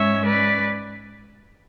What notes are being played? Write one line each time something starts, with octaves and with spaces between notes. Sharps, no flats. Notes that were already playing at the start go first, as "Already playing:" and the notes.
Already playing: G#2 G#3 C#4 C#5 E5
B4 D5